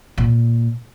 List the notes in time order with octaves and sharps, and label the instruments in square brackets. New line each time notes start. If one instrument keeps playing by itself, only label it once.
[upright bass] A#2